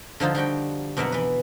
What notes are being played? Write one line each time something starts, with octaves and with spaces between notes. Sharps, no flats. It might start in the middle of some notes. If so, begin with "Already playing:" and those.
D3 F3 D#4 F4
F3 G3 F#4 G5
F2 B2 F#3 A#4 E5 F#5
E3 B4